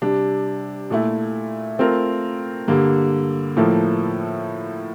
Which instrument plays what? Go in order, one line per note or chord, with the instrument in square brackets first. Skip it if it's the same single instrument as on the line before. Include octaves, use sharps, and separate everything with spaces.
[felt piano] C3 G3 D4
A#2 A3 E4
A3 C4 F4 A#4
G2 D3 G3 A#3
A2 F3 A#3 E4 A4